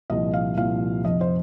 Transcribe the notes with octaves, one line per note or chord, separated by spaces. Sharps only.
C2 A#2 F3 D#5
F5
C2 A#2 F3 F5
F1 F2 F3 D#5
C5